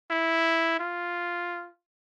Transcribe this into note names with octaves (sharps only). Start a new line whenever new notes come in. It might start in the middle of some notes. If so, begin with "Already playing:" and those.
E4
F4